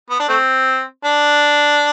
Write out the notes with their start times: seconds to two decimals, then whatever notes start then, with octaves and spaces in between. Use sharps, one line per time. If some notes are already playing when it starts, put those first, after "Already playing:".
0.10 B3
0.20 D4
0.29 A3 C4
1.05 D4